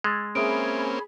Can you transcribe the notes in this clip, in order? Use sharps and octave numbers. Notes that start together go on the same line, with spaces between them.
G#3 E6 G#6 A6
A#3 C4 C#4 G#4 E5 B5 D#6 D7